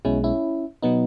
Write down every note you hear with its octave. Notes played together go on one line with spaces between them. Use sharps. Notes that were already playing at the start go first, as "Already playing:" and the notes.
B1 B2 G#3 C#4 E4
C#4 E4
B2 F#3 B3 D#4